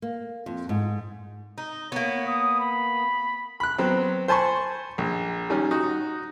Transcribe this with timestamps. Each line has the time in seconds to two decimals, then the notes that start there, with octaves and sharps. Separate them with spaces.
0.02 A#3
0.46 F2
0.69 G#2
1.58 D#4
1.92 A#3 B3 C#5
2.27 D#6
2.60 B5
3.60 B5 F#6
3.78 F#3 B3 C4
4.28 C5 G#5 A5 B5 C#6
4.98 A#1
5.50 D#3 G3 C#4
5.71 D#4 F#4